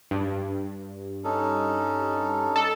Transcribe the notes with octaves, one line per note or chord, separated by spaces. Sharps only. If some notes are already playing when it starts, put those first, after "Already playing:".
G2
C#4 D#4 A4
A4 D5